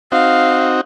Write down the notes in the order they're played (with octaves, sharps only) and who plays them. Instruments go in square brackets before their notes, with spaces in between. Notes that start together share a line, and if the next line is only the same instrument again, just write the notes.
[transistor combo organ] C4 D#4 F#4 [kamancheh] F5